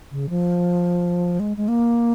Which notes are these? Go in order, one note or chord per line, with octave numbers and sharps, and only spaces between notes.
C#3
F3
G#3
G#3
A#3